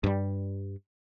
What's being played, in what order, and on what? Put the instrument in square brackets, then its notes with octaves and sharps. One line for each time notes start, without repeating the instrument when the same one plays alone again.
[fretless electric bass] G2 G3